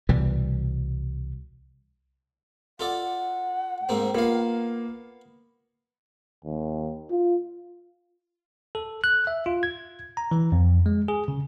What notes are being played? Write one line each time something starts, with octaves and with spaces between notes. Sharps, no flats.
C2 B2 E3 G3
F4 A4 D5 F#5
G#2 A#3 C4
A#3 B3 F4 F5
D#2
F4
A4
F#6
E5
F4
G#6
A#5
E3
F2
G#3
G#4
C#3